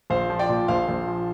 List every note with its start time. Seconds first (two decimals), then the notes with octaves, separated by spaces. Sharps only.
0.10 A#1 C5 F5
0.30 F3
0.39 D5 G5
0.49 A#2
0.68 A#1 C5 F5
0.89 A#1
1.07 F3